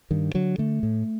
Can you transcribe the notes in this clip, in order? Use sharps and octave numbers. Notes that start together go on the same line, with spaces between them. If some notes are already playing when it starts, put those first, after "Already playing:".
G2 D#3
D3 F#3
D3 A3
A2